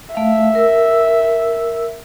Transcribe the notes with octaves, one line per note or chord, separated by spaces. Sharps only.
A3 E5 F5
A#4 E6